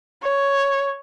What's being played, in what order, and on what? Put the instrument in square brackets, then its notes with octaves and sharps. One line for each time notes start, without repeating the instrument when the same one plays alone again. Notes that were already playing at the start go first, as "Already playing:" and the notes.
[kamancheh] C#5